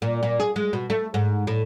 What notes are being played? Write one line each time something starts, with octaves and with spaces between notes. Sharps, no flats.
A#2
A#2
G#4
G#3
B2
A3
G#2
A2